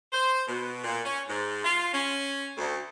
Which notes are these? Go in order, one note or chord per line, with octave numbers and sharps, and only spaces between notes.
C5
B2
A#2
C#4
G#2
F4
C#4
D2